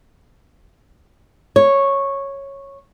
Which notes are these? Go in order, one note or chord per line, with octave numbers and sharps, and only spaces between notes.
C#5